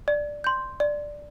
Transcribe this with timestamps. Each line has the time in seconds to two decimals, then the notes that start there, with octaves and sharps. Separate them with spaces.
0.08 D5
0.44 C6 G6
0.80 D5